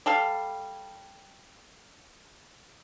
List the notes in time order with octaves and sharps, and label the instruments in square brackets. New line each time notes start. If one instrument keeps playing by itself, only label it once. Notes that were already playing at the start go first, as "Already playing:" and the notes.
[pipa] G3 A4 F5